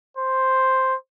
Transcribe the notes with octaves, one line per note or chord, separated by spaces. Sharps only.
C5